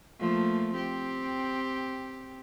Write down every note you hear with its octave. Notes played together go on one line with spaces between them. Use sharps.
F3 A3 A#3
C4 G4